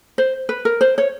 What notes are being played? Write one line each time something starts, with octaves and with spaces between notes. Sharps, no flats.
C5
B4
A#4
C5
C#5